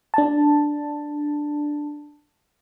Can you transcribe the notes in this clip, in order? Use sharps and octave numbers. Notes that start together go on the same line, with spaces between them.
D4 A5